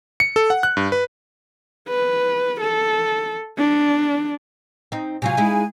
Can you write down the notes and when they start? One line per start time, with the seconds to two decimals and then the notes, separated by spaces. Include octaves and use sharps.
0.20 C#7
0.36 A4
0.50 F#5
0.63 F#6
0.77 G2
0.92 B4
1.88 B4
2.60 A4
3.58 D4
4.92 C4 D#4
5.22 C3 F#3 F4 G#5
5.37 G#3 D#4 E4